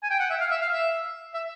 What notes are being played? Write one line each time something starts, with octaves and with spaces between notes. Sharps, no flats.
G#5
G5
F#5
E5
F5
E5
F5
E5
E5